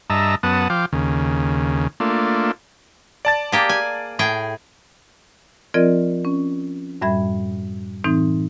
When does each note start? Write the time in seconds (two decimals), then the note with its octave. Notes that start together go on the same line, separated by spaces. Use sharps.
0.10 G2 D#5 E5 A5 A#5
0.43 F#2 B3 F#5 A5 D#6
0.70 F3 F5 G5 D6
0.93 D#2 C#3
2.00 A3 A#3 D4 F4
3.25 D5 A5 A6
3.52 A#3 G4 G#4
3.69 G#5
4.19 A2 G#4 G5
5.74 F3 C4 F4 A#4 D5 D#5
6.25 C#4
7.02 F#2 A2 G3 E5 B5 G#6
8.04 A2 E3 C4 D#4